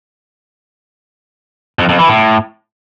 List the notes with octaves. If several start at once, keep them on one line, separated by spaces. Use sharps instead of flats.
F2
F2
E3
A2